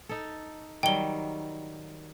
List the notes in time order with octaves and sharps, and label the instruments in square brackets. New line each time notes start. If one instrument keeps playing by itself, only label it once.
[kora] D#4 A4
[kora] D#3 F#3 G3 [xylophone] G5 G7